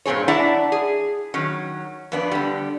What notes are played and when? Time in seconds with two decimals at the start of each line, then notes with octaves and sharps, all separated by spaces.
0.06 G2 A#2 C4 G#4 C#5
0.28 D4 E4 D5 F#5 A5 A#5
0.72 G#4
1.34 D#3 F#3 C#4
2.12 F2 B3 D4
2.31 D3 G3